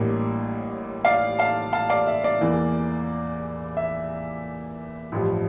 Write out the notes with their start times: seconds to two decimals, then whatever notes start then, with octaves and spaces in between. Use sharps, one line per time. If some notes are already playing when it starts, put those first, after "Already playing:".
Already playing: A1 A2 G3 A#3 D4
1.05 D5 F5
1.39 F5 A5
1.73 F5 A5
1.90 D5 F5
2.07 E5
2.24 D5
2.41 E2 E3 A#3
3.77 E5
5.12 A1 G2 F3